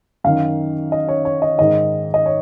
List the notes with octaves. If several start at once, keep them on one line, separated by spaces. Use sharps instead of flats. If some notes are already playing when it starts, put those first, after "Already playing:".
F#2 D#3 F5
D#5
C#5
C#5
D#5
G#2 D#3 D#5
D#5
C#5